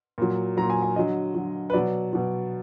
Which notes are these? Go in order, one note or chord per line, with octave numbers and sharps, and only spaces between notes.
A#2 F#3
A#2 F#3 A#5
G#5
G#5
D3 F#3 D#5
D3 F#3
B4
B2 F#3 D5
B2 F#3